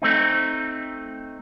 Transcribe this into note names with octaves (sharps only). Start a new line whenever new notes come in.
A3 C4 D#4